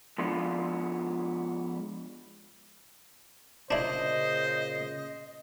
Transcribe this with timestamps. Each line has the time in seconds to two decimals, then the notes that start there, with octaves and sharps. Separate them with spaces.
0.18 F3 G#3 B3 D4 F4
3.71 A#2 C#3 D4 E4 C5 D#5